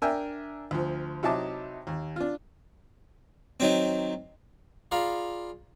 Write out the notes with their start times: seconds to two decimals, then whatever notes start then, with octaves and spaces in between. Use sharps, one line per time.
0.02 D4 A#4 E5 G5 G#5
0.71 D2 F3
1.23 C3 F#3 D#4 E4 A5 D6
1.87 D#2
2.16 D4 F4
3.60 D#3 F#3 C4
4.91 F4 G#4 D5 F5 A#5 B5